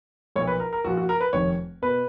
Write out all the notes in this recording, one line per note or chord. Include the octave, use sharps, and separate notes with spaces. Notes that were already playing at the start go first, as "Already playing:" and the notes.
B1 A#2 F3 C#5
B4
A#4
A#4
A#1 A#2 F3 F#4
F#4
A#4
B4
F1 F2 D#3 C#5
B2 B4